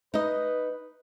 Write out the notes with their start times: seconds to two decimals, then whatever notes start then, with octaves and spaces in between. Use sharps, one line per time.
0.14 D#4 B4 D#5